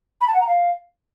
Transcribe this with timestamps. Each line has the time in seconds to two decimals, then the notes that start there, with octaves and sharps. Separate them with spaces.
0.21 B5
0.28 A5
0.34 F#5
0.41 A#5
0.47 F5